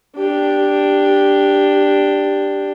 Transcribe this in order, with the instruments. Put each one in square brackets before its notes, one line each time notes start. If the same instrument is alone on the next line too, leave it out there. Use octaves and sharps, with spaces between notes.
[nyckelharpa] D4 G4